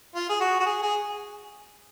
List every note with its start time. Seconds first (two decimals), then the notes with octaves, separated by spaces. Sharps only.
0.15 F4
0.29 G#4
0.40 F#4
0.60 F#4
0.65 G#4
0.82 G#4